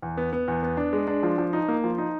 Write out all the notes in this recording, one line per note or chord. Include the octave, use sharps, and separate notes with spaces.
E2
B3
B3
E2
B3
D4
G#3
D4
F3
F3
D#4
A#3
F3
D#4